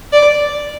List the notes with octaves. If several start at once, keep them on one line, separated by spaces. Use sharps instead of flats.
D5